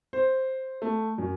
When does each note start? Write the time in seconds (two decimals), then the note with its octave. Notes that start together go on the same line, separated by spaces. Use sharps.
0.13 C5
0.82 A3
1.18 F#2